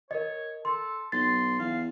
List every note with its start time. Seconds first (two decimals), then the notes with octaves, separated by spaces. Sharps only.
0.11 A#4 C#5 D#5
0.65 A4 C6
1.12 B1 C6 A6
1.59 E2 F5